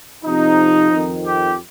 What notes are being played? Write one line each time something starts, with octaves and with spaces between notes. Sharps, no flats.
F2 C3 F3 D#4
F2 D#3
G4